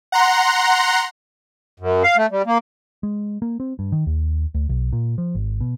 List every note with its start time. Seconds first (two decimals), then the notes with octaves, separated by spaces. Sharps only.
0.12 F#5 A#5 C6
1.80 F#2
2.04 F5
2.17 A3
2.31 G3
2.46 A#3
3.03 G#3
3.42 A#3
3.60 C4
3.79 G2
3.92 D#3
4.07 D#2
4.54 D2
4.69 B1
4.93 A#2
5.18 F3
5.35 G#1
5.61 B2